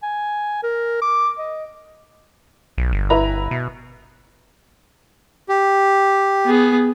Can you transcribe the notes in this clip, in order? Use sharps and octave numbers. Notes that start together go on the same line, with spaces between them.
G#5
A#4
D6
D#5
B1
G1
E4 B4 A#5
B2
G4
B3 G#4